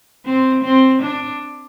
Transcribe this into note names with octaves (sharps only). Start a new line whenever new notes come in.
C4
C4
D4